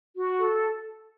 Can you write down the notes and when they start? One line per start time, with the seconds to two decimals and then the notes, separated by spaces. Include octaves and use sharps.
0.16 F#4
0.38 A4